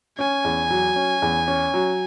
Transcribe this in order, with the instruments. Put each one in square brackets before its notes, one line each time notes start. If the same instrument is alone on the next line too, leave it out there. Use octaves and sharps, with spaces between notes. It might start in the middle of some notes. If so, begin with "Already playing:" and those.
[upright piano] C#4 [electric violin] G#5
[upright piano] E2
F#3
C#4
E2
C#4
F#3